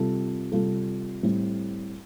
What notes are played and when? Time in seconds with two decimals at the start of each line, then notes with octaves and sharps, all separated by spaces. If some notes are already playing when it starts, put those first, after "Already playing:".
Already playing: C3 G3 F4 A4
0.52 C3 G3 F4 A4
1.23 A2 G3 C4